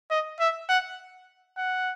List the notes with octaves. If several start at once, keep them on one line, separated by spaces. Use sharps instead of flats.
D#5
E5
F#5
F#5